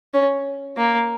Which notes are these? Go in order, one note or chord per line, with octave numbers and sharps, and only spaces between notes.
C#4
A#3